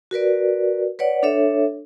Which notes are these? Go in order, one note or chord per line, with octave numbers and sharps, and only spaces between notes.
F#4 A#4 B4 D5
B4 C#5 D5 F#5
D4 A4 C#5 E5